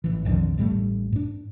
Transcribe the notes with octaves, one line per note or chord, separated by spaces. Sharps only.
A1 E3
B1 F2 D3 D#3
A1 A2 G3 A3
G#2 D4